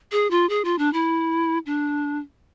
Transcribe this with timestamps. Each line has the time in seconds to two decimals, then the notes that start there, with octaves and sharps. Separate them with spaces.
0.12 G#4
0.30 F4
0.49 G#4
0.65 F4
0.79 D4
0.93 E4
1.66 D4